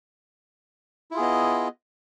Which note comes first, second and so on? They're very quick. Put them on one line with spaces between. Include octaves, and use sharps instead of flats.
E4 F4 G#4 B3 D#5